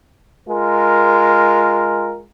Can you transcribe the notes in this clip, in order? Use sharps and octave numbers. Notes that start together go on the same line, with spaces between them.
G#3 F4 A#4